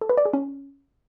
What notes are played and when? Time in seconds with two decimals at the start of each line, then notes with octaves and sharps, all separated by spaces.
0.01 A4
0.09 B4
0.17 D5
0.25 G#4
0.33 C#4